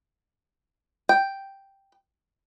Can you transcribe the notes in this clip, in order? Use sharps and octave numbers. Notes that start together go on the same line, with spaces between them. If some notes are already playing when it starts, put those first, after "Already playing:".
G5